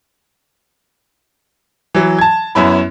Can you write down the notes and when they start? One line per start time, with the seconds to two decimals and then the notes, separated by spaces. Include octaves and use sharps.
1.95 E3 F#3
2.19 A5 G#6
2.55 F#2 B3 C#4 E4 B5